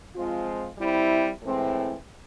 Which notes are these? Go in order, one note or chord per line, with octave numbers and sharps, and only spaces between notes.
F3 G#3 C4 F4
G3 C4 E4
A2 E3 G#3 C4